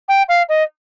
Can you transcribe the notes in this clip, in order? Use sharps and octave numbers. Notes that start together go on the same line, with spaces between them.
G5
F5
D#5